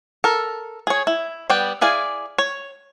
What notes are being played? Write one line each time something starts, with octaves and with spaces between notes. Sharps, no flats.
A4 A#4
G#4 C#5
E4
G3 B3 B4 D5 G5
E4 G#4 D5 F5 G#5
C#5